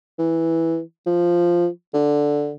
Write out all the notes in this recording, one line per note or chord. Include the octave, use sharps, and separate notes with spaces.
E3
F3
D3